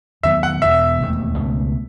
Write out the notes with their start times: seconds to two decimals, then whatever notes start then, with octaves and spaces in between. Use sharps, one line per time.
0.23 E2 D#3 F#3 B3 E5
0.43 F#5
0.62 E1 E2 B2 E5
1.00 E1 D#2 D#3 A3
1.38 C#2 B2 A3